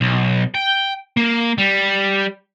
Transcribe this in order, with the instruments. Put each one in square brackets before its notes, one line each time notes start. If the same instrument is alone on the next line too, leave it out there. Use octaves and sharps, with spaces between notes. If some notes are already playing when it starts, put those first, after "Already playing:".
[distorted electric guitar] B1
G5
A#3
G3